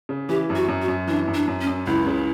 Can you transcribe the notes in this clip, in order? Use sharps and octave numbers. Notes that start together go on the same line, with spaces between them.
C#3
E3 G4
F#2
F#4
F#2
F#4
F#2
E3 D4
F#2
D4
F#2
C#4
F#2
C#2 E4
C#3